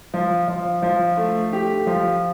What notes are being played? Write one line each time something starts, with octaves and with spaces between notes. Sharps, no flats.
F3
F3
F3
A3
G4
F3